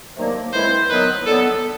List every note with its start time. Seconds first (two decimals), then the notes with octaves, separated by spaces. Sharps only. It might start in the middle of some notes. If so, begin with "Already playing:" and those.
0.17 C3 D#3 F#3 A#3 D4
0.53 A2 E3 G#3 C4 E4 C5
0.89 D#3 F#3 B3 B4
1.26 D3 F#3 B3 A4